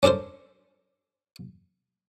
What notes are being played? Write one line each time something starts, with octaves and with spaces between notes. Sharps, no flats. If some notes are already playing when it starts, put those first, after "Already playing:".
C#4 D4 A4 A#4 C5